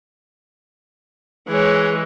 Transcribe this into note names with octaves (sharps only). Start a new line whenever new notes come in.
E3 G#3 G#4 C#5